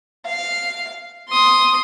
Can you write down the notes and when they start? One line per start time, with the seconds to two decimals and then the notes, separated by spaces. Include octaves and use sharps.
0.26 F5
1.28 C6 D#6